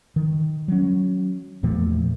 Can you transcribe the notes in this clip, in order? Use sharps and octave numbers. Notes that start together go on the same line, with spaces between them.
D#3
F#3 C#4
E2 A#2 F3 A3